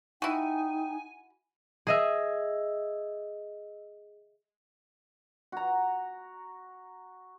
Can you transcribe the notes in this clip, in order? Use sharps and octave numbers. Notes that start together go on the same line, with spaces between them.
D#4 E4 F#4 G5 G#5
G#4 D#5 E5
F#4 A#5